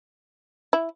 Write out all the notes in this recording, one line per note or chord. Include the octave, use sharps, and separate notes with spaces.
E4